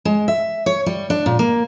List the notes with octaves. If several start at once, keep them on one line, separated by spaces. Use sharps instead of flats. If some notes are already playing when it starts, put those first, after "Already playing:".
G#3
E5
C#5
G3
D4
A#2
A#3